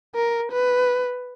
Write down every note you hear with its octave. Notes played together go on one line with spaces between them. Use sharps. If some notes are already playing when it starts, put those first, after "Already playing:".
A#4
B4